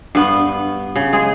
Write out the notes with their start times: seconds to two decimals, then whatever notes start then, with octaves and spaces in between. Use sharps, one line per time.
0.15 G2 B3
0.96 C#3
1.13 G#3 G#4